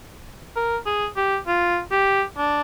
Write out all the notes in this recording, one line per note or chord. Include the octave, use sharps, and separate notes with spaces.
A#4
G#4
G4
F4
G4
D4